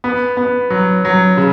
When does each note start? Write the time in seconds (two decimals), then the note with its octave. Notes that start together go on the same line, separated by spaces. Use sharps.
0.04 B3
0.37 B3
0.70 F#3
1.05 F#3
1.37 C#3